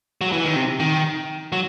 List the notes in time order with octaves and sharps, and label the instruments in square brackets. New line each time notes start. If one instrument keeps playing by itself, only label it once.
[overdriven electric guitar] F#3
E3
D#3
C3
D#3
F#3